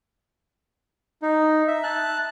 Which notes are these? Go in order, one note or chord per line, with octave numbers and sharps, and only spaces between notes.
D#4
E5
A5 F#6